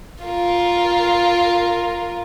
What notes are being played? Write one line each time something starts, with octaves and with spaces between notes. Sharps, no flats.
F4 A#4